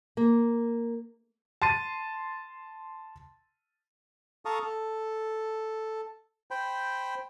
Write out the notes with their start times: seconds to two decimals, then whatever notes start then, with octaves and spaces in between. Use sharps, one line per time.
0.17 A#3
1.62 A5 C6 A6 D#7
4.45 A4 F5 A5 A#5 C#6 D#6
4.62 A4
6.51 C5 G5 B5